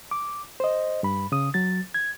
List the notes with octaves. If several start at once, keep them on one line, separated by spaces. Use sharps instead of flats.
D6
C5 D#5
G2 B5
C#3 D#6
F#3 A6
G#6